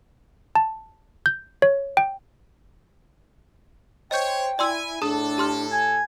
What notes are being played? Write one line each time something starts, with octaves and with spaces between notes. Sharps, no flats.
A5
G6
C#5
G5
C5 C#5 D#5 G5 G6
E4 D5 G#5 C6 E6
A2 D4 G#4 A4 A5 D#6
G4 C6 F6
G#5